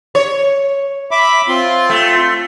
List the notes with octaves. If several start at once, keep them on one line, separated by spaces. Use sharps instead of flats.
C#5
E5 B5 D6
C4 F4 C6
A3